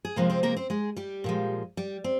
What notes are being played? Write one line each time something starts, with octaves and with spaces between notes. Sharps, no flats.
G#4
C3 F3 G#3 A#3 A#4
C4 C5
A#3 A#4
C4 C5
G#3 G#4
G3 G4
A#2 F3 G#3
G3 G4
C4